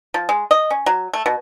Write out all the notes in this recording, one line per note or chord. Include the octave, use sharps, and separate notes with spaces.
F3
G#3
D#5
C#4
F#3
A3
B2